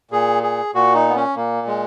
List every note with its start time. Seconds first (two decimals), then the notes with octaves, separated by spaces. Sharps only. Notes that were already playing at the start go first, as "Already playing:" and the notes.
0.11 A#2 G#4
0.43 G#4
0.75 A#2 F#4
0.94 D#4
1.09 B3
1.16 C#4
1.36 A#2 A#3
1.67 G#3